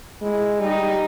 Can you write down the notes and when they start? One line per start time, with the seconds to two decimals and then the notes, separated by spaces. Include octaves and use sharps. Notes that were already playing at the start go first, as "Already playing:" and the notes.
0.21 G#3 E4
0.60 G3 D#4